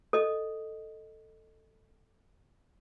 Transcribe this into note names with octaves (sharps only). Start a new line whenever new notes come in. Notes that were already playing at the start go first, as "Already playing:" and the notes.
A4 D#5